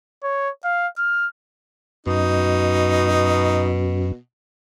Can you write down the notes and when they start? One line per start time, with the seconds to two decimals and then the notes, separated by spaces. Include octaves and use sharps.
0.23 C#5
0.64 F5
0.98 F6
2.06 F#2 B2 D#4